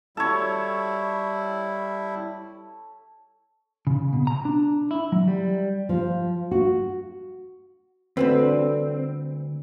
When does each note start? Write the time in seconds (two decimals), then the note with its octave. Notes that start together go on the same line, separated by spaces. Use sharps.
0.17 G3 E4 A4 C#5
3.87 C#3
4.13 B2
4.27 A#5
4.45 D4
4.91 E4
5.12 F#3
5.28 G3
5.89 F3
6.51 F#4
8.17 D2 D3 E3 G3 C4 B4